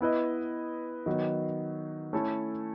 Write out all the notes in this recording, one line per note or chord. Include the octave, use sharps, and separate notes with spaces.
B3 E4 B4 D#5
D#3 F#3 B3 D#4
A3 C#4 E4 A4